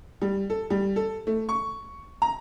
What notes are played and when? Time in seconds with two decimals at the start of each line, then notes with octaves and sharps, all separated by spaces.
0.22 G3
0.50 A4
0.70 G3
0.96 A4
1.27 A3
1.49 C#6
2.22 A#5